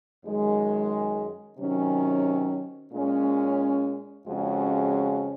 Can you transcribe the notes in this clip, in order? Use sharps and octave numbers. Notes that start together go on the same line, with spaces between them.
F#2 D#3 G#3
C3 D#3 F#3 C#4
A#2 G#3 C#4
F2 C#3 G#3 C#4 F#4